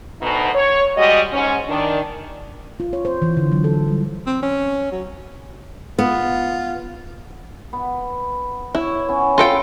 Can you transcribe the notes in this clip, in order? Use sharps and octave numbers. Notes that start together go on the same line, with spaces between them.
D2 B2 D#4
C#5
G3 G#3 F#4 D#5
G#2 C#4
D#3 D4
F4
C#5
C5
E3
D3
F#3
A4
G3
C4
C#4
F#3
B3 F4
B3
E4 C#5
B3 C#4
F4 A4 G5